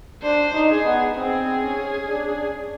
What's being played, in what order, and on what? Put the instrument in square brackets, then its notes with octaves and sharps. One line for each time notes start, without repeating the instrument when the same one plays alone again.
[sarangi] D4 [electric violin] C5
[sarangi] D#4
[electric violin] G#4
[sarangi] B3
[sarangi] C4 [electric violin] G#4
[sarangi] C#4
D4